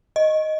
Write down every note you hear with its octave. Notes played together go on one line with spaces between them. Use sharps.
D#5